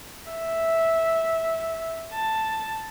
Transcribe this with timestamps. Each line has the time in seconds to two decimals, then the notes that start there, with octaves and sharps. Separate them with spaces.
0.30 E5
2.13 A5